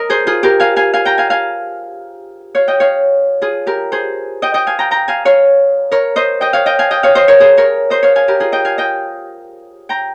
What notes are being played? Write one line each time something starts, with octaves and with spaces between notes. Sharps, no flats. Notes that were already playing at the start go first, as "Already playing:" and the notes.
Already playing: A#4 D#5
G#4 C5
F4 G#4
G4 A#4
F5 G#5
F5 G#5
F5 G#5
G5 A#5
F5 G#5
F5 G#5
C#5 F5
D#5 G5
C#5 F5
F4 G#4
G4 A#4
G#4 C5
D#5 G5
D#5 G5
F5 G#5
G5 A#5
G5 A#5
F5 G#5
C#5 F5
A#4 C#5
C5 D#5
D#5 G5
C#5 F5
D#5 G5
F5 G#5
D#5 G5
C#5 F5
C5 D#5
A#4 C#5
G#4 C5
A#4 C#5
C5 D#5
C#5 F5
F5 G#5
G4 A#4
F4 G#4
D#5 G5
F5 G#5
D#5 G5
G5 A#5